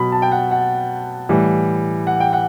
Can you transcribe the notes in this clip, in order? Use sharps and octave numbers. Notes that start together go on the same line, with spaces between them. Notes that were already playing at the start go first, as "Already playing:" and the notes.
Already playing: B2 F#3 B5
A5
G5
F#5
F#5
A2 E3 G3
F#5
G5
F#5